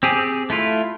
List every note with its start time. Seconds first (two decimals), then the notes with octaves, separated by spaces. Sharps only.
0.03 C4 G4 G#4
0.50 A3 E4 F4